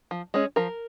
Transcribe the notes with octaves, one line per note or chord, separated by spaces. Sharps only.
F3
G#3 C#4
F3 A#4